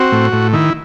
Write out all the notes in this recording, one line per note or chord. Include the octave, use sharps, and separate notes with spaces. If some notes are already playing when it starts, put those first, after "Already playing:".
Already playing: C4 F#4
A2
A2
D#3 E4